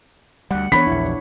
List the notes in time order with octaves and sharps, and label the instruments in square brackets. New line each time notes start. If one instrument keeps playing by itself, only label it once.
[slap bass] D2 G3 [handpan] F#5
[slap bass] E3 A3 B3 [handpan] D4 C#5 [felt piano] B5 B6
[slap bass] A#1 E2 [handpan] E4